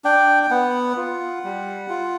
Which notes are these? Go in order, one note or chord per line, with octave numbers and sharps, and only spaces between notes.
D4 G5
G5
B3 F#5
F4
G3
F4